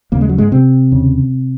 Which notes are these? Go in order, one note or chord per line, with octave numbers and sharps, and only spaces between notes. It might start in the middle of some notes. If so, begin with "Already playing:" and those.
D#2 C#3 A#3
G#3
F#3
G#2 G#3
C3 C4
D#2 C#3